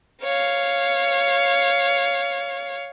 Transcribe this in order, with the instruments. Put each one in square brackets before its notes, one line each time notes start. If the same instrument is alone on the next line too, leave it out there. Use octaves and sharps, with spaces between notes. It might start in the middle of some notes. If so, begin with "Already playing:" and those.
[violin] C#5 F5